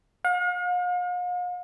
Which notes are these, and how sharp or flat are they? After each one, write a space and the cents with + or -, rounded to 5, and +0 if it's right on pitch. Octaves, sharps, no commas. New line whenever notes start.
F5 +45